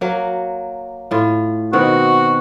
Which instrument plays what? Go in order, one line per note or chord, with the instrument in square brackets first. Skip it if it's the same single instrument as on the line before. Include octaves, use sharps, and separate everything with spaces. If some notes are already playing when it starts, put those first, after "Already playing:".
[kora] F#3 A#3
A2 F4
[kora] B2 D#3 C4 [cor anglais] F#4